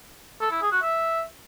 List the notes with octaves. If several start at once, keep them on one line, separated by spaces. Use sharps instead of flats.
A4
E4
G#4
F#4
E5